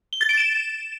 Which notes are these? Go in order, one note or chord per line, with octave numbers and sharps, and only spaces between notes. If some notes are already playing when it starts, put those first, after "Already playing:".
G7
A6
D7
E7